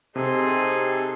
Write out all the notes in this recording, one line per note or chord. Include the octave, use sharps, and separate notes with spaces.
C3 D#4 G#4 A4 G#5 C6